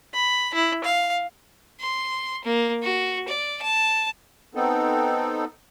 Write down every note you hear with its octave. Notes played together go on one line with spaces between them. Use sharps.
B5
E4
F5
C6
A#3
F#4
D5
A5
B3 C4 D#4 A4